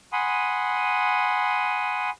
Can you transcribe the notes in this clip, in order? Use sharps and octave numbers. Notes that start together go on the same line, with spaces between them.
F#5 G#5 B5 C6 D#6